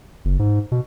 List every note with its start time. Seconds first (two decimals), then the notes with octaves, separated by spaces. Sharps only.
0.25 F#1
0.39 G#2
0.72 B2